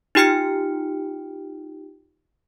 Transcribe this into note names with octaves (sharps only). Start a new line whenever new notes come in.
D#4 F4 G4 G5 F6 C#7